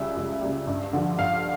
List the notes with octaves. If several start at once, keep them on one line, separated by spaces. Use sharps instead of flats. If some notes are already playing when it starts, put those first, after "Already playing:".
Already playing: C#2 C#3 G3 E5
C#2
C#3 G3
G2
D3 F3
G2 F5